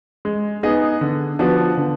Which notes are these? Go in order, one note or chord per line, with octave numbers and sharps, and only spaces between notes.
G#3
B3 D#4 G#4 D#5
D3
F3 B3 D4 F#4
D3